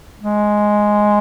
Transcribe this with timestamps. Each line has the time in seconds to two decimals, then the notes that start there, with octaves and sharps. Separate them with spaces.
0.20 G#3